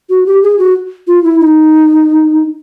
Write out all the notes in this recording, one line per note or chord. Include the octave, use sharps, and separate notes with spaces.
F#4
G4
G#4
F#4
F4
E4
D#4